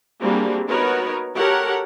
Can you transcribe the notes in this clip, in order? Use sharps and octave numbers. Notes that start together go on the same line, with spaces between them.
G3 A#3 C4 D4 F#4 G#4
B3 D#4 F#4 A#4 B4 C#5
F#4 G4 A4 A#4 C#5 F#5